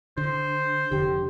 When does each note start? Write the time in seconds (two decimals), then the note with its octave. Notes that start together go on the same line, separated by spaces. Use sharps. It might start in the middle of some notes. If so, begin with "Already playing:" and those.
0.18 D3 C5
0.92 F1 D3 G4